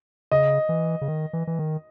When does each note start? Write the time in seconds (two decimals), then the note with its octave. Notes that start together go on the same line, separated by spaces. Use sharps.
0.32 C#3 D#5
0.69 E3
1.01 C#3
1.08 D#3
1.33 E3
1.47 E3
1.59 D#3